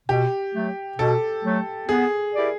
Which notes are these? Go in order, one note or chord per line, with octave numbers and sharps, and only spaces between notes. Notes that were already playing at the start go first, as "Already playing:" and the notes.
B2 G4
F#3 A3
B2 A4
F#3 A3
B3 G#4
E4 G4 A#4 D5